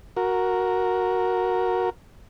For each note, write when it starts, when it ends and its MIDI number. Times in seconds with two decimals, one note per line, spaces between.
0.17 1.90 66
0.17 1.90 70